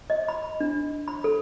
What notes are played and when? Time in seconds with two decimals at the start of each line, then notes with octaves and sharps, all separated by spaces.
0.10 D#5
0.28 B5
0.60 D4
1.08 B5
1.24 A4